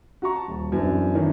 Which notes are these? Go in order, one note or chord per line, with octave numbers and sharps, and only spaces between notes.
F#4 A#5 C#6
A5
D#1 A5
F#2 E3 B3 C4 D4
D#3 E3 C#4 D4